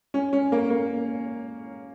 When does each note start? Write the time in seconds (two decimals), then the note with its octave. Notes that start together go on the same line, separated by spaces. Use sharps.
0.14 C#4
0.33 C#4
0.52 A#3
0.70 A#3